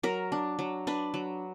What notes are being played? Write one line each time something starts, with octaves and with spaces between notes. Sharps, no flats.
F#3 A#4
D4
F#3
D4 B4
F#3